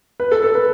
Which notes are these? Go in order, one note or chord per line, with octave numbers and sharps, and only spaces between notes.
B4
A4
A4
B4